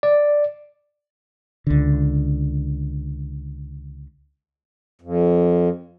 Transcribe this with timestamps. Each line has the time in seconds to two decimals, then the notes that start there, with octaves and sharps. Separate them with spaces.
0.03 D5
1.67 C#2 D3
5.02 F2